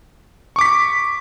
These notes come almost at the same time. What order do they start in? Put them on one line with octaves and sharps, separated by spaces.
C#6 D6 B6